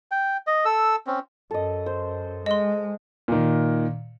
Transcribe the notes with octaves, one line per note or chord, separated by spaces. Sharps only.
G5
D#5
A4 E6
C4 C#4
F#2 A4 D#5
C5
G#3 D#5 C6
A#2 D#3